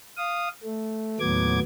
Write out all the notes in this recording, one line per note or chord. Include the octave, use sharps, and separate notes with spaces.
F5 D#6
A3
D#2 A2 F#3 B3 D6 G#6